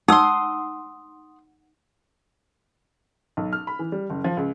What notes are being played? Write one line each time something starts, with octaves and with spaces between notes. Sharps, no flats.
D#4 F#5 C6 D#6 E6
B1
F6
B5
E3
G3
F#1
F3
C#2